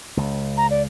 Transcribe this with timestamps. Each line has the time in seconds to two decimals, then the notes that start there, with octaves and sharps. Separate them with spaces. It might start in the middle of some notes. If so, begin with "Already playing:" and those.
0.17 C#2
0.57 A#5
0.71 D5